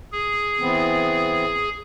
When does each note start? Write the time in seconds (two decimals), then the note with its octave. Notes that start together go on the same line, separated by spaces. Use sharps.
0.12 G#4
0.60 E3 B3 C4